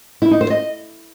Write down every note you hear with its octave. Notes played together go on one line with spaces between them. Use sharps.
E4
D#4
C5
D#5